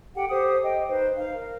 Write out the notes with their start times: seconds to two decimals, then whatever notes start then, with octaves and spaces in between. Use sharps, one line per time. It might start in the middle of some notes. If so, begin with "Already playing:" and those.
0.15 G4 A4 F#5 G5
0.28 G4 A4 C5 D#6
0.62 D#5 G5
0.88 D#4 B4 C5
1.15 D#4 F5
1.34 A#4